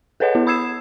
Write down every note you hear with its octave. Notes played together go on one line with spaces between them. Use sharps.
G#4 A4 B4 C#5 D#5 F#5
B3 E4
B5 D#6 E6 G#6 C7 E7